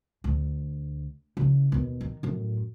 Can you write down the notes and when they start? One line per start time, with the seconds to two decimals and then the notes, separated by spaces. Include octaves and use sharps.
0.24 D2
1.37 C#3 E3
1.72 D#2 B2
2.01 D#3
2.23 F#2 A2